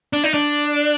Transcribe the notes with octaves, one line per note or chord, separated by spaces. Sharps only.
D4
D#4
D4